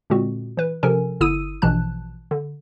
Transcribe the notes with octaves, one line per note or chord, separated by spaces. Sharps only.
A#2 D3 G#3 C4 F#4
E3 B4
C3 F3 C#4 A4 A#4 G#5
G1 D3 E4 D#6 E6 D#7
A#1 B2 E3 F3 A5 F#6
D3